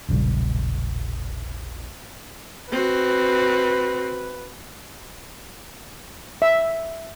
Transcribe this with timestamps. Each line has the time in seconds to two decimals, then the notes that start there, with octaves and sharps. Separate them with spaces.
0.08 E1 A#1 C#3 G3
2.71 C4 F#4 B4
6.42 E5